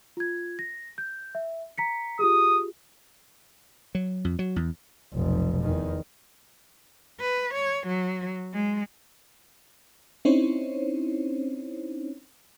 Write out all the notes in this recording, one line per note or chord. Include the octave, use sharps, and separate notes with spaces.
F4 G#6
A#6
G6
E5
A#5 B6 C#7
F4 G4 G#4 D#6
F#3
F2
F#3
E2
F1 B1
E2 D#3
B4
C#5
F#3
G#3
C4 C#4 D#4 E4 C5 C#5